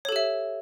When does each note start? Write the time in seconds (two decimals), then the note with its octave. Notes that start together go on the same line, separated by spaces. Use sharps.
0.05 C#5
0.09 A4
0.12 G4
0.16 E5